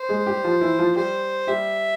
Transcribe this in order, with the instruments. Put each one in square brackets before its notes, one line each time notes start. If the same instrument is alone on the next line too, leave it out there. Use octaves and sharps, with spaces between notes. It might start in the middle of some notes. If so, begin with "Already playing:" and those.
Already playing: [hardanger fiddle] C5
[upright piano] G#3 G#4
G3 G4
F3 F4
E3 E4
F3 F4
[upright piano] G3 G4 [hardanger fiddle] C5
[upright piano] G3 G4 [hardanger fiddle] E5